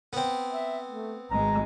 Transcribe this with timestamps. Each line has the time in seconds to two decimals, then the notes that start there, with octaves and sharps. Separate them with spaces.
0.13 B3 C4
0.51 E5
0.89 A3
1.31 G#1 G#3 A#5